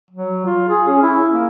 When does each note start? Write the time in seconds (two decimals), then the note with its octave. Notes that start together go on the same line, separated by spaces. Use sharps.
0.11 F#3
0.46 F4
0.69 G#4
0.88 C#4
1.03 E4
1.33 A#3